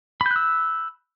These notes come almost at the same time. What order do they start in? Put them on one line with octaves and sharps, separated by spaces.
B5 G6 F#6 E6